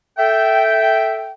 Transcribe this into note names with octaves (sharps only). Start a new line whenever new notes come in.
A4 E5 G5